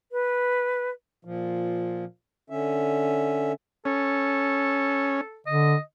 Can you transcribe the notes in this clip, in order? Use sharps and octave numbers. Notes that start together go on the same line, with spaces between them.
B4
A#2 F3
D3 C#4 E5
C#4 A4
D3 D#5